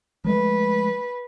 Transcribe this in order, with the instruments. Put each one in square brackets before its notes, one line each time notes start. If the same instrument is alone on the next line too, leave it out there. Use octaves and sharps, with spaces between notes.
[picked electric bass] F3 G#3 A3 [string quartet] B4